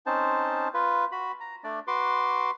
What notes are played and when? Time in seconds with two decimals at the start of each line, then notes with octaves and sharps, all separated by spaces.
0.06 C4 C#4 D#4 C5 A5
0.74 F4 B4
1.12 F#4 B5
1.40 A#5
1.64 A3 D4 D5
1.87 F#4 B4 C6 D6